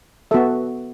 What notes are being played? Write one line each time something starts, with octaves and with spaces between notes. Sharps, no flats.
B3 F#4 A4 E5